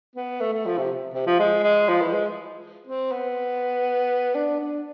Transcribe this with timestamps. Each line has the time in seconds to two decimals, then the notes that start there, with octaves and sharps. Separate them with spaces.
0.16 B3
0.41 A3
0.53 A3
0.66 F3
0.78 C3
1.14 C3
1.27 F3
1.40 G#3
1.63 G#3
1.89 F3
2.01 E3
2.13 G#3
2.87 C4
3.12 B3
4.35 D4
4.60 D4